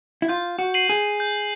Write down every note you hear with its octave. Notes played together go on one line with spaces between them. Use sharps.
E4
F4 G6
F#4
C7 D#7 F#7
G#4
G6